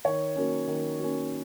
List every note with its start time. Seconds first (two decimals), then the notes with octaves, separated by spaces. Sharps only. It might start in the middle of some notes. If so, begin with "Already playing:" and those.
0.05 D#3 C#5
0.36 F#3 A#3 C#4
0.67 D#3
0.99 F#3 A#3 C#4